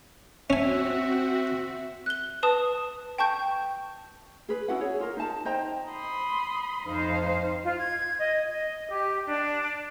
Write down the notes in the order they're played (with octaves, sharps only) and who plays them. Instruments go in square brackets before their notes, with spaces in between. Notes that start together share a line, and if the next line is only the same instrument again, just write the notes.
[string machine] C4 F#4 [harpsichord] C#4 G#5 [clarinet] E5
[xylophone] F#6 G7
B4 A5 D#6
G5 A5 C#6 G6
[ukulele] G#4 B4
C#4 E4 F#4 F#5
G#4 C#5
F4 A#4
D#4 A5
C5 D#5 G5 A#5
[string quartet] B5 C6 D#6
[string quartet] F2 [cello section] D#4 C5 F5
[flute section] F4
G#6
D#5
D#5
G4
D4